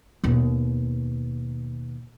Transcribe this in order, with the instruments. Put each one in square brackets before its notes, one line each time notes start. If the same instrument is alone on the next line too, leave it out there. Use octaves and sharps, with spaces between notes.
[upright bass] D#2 B2